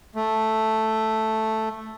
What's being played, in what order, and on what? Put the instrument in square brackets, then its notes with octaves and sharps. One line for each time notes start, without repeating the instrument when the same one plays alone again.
[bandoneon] A3